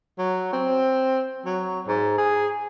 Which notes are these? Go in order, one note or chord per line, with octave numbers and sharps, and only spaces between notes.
F#3
C4
F#3
G#2
G#4